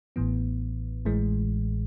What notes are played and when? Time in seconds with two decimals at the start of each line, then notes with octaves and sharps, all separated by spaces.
0.16 A1 A2 E3 B3
1.05 A1 A2 E3 G#3